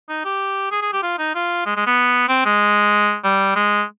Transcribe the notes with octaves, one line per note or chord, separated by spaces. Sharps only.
D#4
G4
G#4
G#4
G4
F4
D#4
F4
G#3
G#3
B3
C4
G#3
G3
G#3